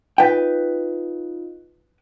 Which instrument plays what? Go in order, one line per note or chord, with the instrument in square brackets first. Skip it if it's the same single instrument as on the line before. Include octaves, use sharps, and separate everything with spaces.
[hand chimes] D#4 F4 D#5 [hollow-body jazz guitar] B4 G5